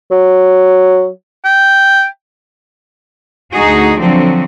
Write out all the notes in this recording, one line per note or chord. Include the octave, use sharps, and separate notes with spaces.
F#3
G5
D2 D#4 F#4 G#4
D3 F3 F#3 C4